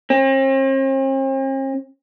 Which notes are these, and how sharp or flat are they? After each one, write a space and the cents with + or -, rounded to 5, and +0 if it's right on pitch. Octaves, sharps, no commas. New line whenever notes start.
C4 +45